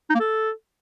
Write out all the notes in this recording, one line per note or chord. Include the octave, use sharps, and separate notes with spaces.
D#4
A#3
A4